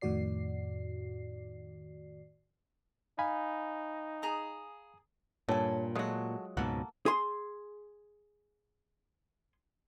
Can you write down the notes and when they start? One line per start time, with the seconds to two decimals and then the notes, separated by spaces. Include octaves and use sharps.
0.01 F2 A2 D#3 F#4 D5 C7
3.19 D#4 F5 G#5 B5
4.22 G#4 A#5 D#6
5.49 G2 A#2 A4 C#5 G#5
5.96 F#3 G#3 A3 F4 F#4 D#6
6.57 C#2 G#2 B2 A#3 A4 F#5
7.06 G#4 C6